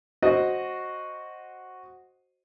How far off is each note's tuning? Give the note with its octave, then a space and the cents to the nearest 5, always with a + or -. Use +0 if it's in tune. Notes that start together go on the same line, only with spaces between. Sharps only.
F#4 +0 C5 +10 D#5 +0